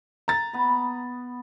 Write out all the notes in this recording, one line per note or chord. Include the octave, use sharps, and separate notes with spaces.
A#5 A6
B3 B5